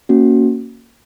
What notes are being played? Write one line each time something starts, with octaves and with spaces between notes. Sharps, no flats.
A#3 C#4 F#4